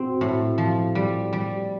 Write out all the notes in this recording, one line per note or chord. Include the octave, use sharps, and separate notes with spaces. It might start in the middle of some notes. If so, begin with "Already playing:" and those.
Already playing: C4 F#4
A2
F3
G3
G3